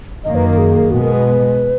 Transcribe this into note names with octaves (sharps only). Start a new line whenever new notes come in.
F#2 D#3 A#3 D#5
B4
A#4
G#4
B2 G#3 B3 F#4
A#4
B4